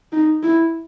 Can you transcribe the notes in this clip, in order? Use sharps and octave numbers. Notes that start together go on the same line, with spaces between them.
D#4
E4